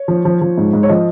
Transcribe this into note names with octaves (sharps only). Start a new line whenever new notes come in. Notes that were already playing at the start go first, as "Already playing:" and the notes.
Already playing: C#5
F3
F3
F3
G#2
G#2
C#5
F3 D#5